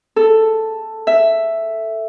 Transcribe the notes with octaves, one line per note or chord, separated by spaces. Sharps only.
A4
E5